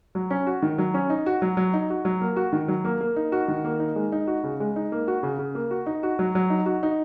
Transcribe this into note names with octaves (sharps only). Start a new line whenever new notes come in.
F#3
C#4
F#4
D#3
F#3
C#4
D#4
F#4
F#3
F#3
D#4
F#4
F#3
A#3
F#4
D#3
F#3
A#3
A#3
D#4
F#4
D#3
A#3
D#4
G#3
D#4
F#4
C#3
G#3
D#4
A#3
F#4
C#3
C#3
A#3
F#4
D#4
F#4
F#3
F#3
D#4
F#4
D#4